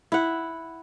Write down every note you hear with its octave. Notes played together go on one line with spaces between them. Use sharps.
E4 F#5